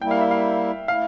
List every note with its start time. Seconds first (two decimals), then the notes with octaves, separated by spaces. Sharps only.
0.01 G3 A#3 E4 G5
0.11 F5
0.21 E5
0.31 F5
0.88 A3 E4 F5